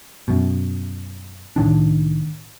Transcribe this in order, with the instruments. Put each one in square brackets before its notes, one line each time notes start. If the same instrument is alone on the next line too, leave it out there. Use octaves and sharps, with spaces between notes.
[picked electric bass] F#2 B2
C2 A2 D#3 D4